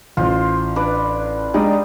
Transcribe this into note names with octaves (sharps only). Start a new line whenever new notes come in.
A1 F4 C5
D4 B4 D5
G3 G#3 D4 D#4 D5 D#6